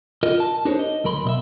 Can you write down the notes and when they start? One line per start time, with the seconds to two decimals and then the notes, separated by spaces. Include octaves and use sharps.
0.23 F4 A#4 D#5
0.40 A5
0.65 D4 D#4 G4 A#4 C5 C#5
0.79 D#5
1.04 D2 F#3 A#4 B5 C6
1.25 B2 D#5 E5